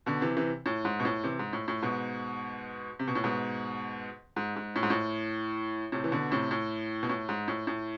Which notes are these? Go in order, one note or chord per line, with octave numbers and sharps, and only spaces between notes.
B2 D3
C3 E3
C3 E3
A2
G#2
B2
A2
C3 E3
G#2
A2
A2
G#2 B2
C3
B2
A2
G#2 B2
G#2
G#2
A2
G#2
A2
A2 C3
E3
B2 D3
A2 C3
A2
B2
A2
G#2
A2
A2